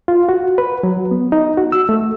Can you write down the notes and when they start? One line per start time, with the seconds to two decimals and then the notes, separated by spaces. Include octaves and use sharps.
0.08 F4
0.29 F#4
0.58 B4
0.83 F#3
1.11 B3
1.32 D#4
1.57 F#4
1.72 E6
1.89 A3